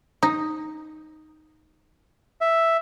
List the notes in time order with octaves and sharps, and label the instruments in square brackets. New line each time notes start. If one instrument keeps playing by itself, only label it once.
[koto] D#4
[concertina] E5